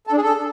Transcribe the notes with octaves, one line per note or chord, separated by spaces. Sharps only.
A4
D4
G#4
A4